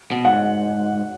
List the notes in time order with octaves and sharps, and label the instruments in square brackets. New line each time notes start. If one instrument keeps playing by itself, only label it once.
[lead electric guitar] B2
[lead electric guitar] G#2 [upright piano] F#5